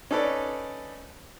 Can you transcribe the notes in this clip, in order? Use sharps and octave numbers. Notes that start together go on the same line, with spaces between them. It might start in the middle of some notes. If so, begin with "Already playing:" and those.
C#4 D#4 A4 B4 D5